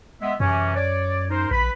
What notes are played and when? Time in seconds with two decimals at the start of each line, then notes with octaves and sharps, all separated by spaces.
0.21 G#3 B3 E5
0.40 F#2 C3 E3 C#4
0.75 C#5 D5
1.30 D#4 A#4 C5
1.51 A#1 B4 B5